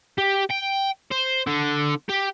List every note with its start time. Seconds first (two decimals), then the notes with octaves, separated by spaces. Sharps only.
0.18 G4
0.51 G5
1.11 C5
1.47 D3
2.09 G4